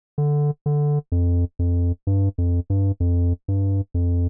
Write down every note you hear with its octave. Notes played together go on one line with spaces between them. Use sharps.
D3
D3
F2
F2
G2
F2
G2
F2
G2
F2